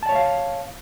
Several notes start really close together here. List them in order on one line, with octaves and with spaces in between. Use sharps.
A5 D5 C#5 E5 F5